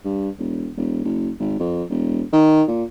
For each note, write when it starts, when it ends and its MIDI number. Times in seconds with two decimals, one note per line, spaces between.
0.05 0.29 43
0.39 0.70 28
0.77 1.03 28
1.05 1.30 30
1.40 1.56 32
1.60 1.83 41
1.90 2.23 28
2.33 2.63 51
2.68 2.84 46